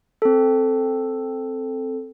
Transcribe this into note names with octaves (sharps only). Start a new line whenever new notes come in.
C4 A4